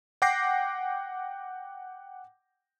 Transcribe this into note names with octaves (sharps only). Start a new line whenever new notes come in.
F#5 G5 D6 G6 A#6 C7